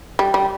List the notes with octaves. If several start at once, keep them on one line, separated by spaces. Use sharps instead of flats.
G3
G3